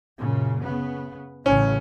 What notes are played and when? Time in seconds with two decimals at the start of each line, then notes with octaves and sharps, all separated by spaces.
0.19 F#2 A#2 C#3
0.64 C#3 B3
1.46 A1 A2 C#3 C#4